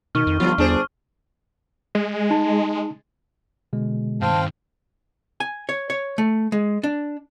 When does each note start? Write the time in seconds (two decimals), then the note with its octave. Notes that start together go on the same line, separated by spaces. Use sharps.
0.15 B2 D#3 C#6 F6
0.27 F2
0.40 G1 G2 F3 F4
0.58 G1 E2 D4 G#4 C5
1.95 G#3
2.30 D#4 A5
3.73 B2 D3 G#3
4.22 G2 D#3 C4 F5 G5 A5
5.40 G#5
5.69 C#5
5.90 C#5
6.18 A3
6.52 G#3
6.83 D4